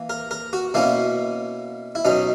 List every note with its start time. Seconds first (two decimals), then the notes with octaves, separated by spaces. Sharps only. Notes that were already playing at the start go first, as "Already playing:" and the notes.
Already playing: E3 A#3
0.10 A#4
0.31 A#4
0.53 F#4
0.74 B2 A#3 C#4 E4
1.95 E4
2.05 B2 F#3 C#4 D#4